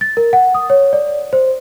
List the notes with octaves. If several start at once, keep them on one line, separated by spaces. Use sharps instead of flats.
A6
A#4
F#5
D#6
C#5
D5
C5